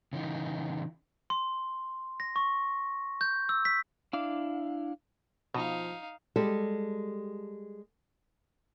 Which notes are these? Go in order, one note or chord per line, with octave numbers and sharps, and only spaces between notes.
C#3 E3 D#4
C6
A#6
C#6
G6
E6
B6
D4 E4 F5 D6
B2 F3 D#4 F5
G3 G#3 G4 A4